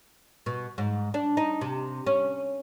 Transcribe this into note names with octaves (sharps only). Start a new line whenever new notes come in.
B2
G#2
D4
D#4
C3
C#4